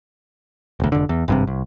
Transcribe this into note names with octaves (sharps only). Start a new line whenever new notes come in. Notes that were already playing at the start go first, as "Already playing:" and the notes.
E1 D2
F1 D3
E2
G#1 G2 C3
C2